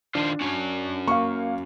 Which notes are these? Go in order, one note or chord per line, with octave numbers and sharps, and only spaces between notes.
D#3 D4 F4 C5
C#4 F#4
A#3 F5 C#6